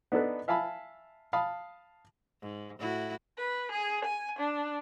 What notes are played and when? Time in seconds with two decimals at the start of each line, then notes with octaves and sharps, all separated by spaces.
0.12 B3 D4 D#4 A4 B4
0.48 E5 F5 G#5 A5 B5
1.33 F5 A5 B5 D#6
2.41 G#2
2.79 A2 E4 F#4
3.39 B4
3.72 G#4
4.05 G#5
4.40 D4